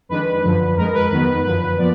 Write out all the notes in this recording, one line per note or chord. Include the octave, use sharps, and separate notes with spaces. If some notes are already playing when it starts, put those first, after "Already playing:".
F2 D#3 G#3 D4 B4
F#2 D3 F3
F2 F3 G#3 A#4
B4
F2 D#3 F#3 B3
F#2 D3 F3 B4
A#2 F3 B3 D5